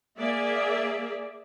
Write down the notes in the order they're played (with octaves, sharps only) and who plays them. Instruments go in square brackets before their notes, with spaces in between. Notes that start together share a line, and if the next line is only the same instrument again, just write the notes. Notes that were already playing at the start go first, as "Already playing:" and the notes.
[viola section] A#3 G#4 D5 E5